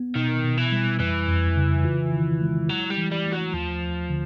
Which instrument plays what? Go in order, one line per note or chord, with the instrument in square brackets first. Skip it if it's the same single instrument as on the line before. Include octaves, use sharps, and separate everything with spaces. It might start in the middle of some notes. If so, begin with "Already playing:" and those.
Already playing: [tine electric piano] B3
[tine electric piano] B2 [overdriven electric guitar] D#3
[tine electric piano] B2
[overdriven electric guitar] E3
[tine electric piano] G3
[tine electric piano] F2 [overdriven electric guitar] E3
[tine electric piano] F2
C#3
F4
D#3
G#3
[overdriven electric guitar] F#3 [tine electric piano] E4
[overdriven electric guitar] G3
[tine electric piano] E3
[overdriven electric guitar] G3
[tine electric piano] A3
[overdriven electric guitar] F#3
[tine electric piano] D#2 [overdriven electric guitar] F3
[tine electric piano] D#2
D3